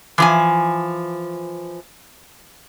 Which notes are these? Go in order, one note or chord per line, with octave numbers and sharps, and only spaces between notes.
E3 F3 G#5